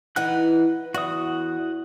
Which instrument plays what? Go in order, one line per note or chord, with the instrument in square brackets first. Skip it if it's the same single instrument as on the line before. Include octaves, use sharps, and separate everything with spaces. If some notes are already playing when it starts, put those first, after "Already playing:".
[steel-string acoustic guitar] E3 D#4 [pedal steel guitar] B4 F#5 F#6
[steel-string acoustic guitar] E2 [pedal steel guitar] F#4 D#6